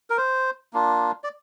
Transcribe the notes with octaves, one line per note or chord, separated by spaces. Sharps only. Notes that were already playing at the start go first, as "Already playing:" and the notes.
A#4
C5
A#3 D4 F4
D5